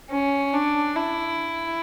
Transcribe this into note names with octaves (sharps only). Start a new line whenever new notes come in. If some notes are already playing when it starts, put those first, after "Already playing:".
C#4
D4
E4